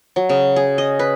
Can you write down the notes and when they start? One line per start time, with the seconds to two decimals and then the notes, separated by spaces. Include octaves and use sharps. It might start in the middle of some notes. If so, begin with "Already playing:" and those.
0.16 F#3
0.29 C#3
0.56 G#4
0.78 D#5
0.99 B4